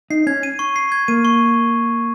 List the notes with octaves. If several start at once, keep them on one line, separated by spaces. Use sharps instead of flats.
D#4 C7
C#4 G#6
D#7
C#6
C7
G#6
A#3 D#7
C#6